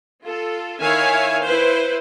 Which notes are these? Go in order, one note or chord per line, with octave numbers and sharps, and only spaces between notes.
F4 A4
D#3 E4 C#5 E5 F5 G#5
E4 B4 C5